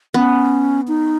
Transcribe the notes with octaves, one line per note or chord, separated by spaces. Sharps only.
B3 C#4
D#4